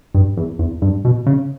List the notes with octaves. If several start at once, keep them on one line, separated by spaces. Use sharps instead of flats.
G2
E2
E2
G2
B2
C#3